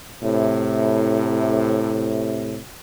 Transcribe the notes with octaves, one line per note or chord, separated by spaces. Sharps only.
A2 C3